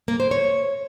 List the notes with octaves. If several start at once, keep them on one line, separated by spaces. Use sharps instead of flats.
A#3
C5
C#5